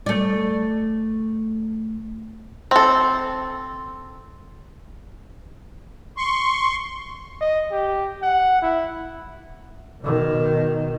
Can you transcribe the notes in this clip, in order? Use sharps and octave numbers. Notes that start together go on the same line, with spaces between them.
A3 D5
C4 A4
C6 C#6
D#5
G4
F#5
E4
B2 D#3